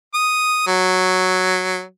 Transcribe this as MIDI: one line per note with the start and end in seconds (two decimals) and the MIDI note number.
0.14 0.65 87
0.67 1.81 54